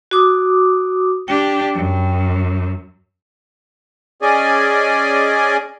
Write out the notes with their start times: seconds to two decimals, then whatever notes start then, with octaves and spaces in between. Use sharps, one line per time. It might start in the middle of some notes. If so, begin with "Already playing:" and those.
0.11 F#4 D6 D#6
1.28 D4 G4 G5
1.75 F#2
4.22 C#4 G#4 D5 D#5 G#5